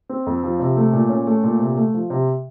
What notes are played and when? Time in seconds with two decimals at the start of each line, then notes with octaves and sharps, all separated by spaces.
0.09 C4
0.26 F2
0.44 F3
0.60 C3
0.77 A3
0.93 A#2
1.09 C#4
1.27 A3
1.44 A#2
1.60 C3
1.77 A3
1.94 F3
2.10 C3